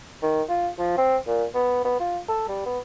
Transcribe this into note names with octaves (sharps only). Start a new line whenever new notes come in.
D#3
F4
F3
C4
A#2
B3
B3
F4
A4
G3
B3